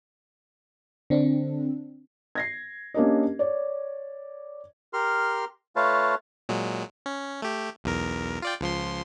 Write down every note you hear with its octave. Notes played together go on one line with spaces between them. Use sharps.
D3 C4 D4
G#6 A#6 C7
A#3 C#4 D4 G4 A#4 D#5
C#5 D5
G4 A#4 C6 F6
A3 F4 B4 C#5 F5 A5
A#2 F#3 G#3
C#4
A3 G4
B1 E2 A#4
F4 D5 G5
C#2 F3 C6